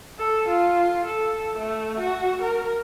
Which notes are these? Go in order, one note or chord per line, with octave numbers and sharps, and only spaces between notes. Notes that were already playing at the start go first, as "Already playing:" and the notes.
A4
F4
A4
A3
F#4
A#4